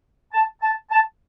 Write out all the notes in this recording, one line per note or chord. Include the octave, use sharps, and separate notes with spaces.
A5
A5
A5